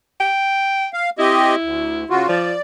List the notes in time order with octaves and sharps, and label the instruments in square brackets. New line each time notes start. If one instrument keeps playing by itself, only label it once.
[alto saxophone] G5
[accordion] F5
[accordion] C4 G4 D#5 [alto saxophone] E4
[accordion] D2
C#3 F4 F#4
[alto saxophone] F3 [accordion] D5